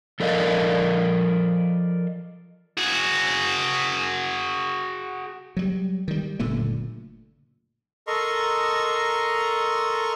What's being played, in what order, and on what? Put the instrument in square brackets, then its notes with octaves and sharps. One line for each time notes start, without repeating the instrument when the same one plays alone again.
[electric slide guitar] F3 A4 A#4 D5 D#5 F5
[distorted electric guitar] F#4 G#4
[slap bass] F#3 G3
D#3 G3
F#1 A#2 D3 A3
[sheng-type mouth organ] A4 A#4 D#5 A#5 C6 C#6